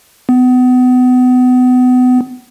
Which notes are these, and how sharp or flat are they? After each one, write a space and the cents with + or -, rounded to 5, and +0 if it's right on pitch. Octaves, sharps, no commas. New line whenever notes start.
B3 +30